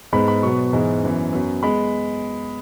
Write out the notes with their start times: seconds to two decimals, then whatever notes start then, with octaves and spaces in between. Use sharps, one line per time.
0.13 G#2 G#3 B3 B5
0.28 B5
0.42 B2 F#3 B3 C#6
0.73 G#2 E3 G#3 B3
1.03 F#2 E3 B3
1.33 F#2 F#3 B3
1.63 G#3 B3 B5